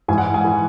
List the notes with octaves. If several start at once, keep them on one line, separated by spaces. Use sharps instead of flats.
G#2 E3 G#5
F#5
G#5
E3